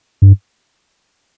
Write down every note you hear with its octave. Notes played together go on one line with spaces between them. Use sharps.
G2